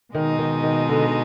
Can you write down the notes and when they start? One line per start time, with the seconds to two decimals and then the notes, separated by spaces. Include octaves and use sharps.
0.14 B2 D#3 G#3 D#4
0.39 D#3
0.63 D#3
0.89 D3
1.06 D3